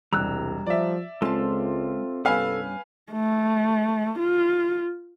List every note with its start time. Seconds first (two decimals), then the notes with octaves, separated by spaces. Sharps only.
0.13 E1 C2 G3 A#5 E6 F#6
0.67 F3 D5 E5
1.22 C#2 G#3 C4 F4 A4 A5
2.25 C2 G2 B3 C#4 A4 B4 F5 G#5
3.13 A3
4.19 F4